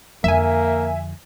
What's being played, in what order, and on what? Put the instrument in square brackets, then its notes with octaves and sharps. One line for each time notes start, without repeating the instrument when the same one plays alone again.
[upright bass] F2 D3 [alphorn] A#3 [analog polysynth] E5 G#5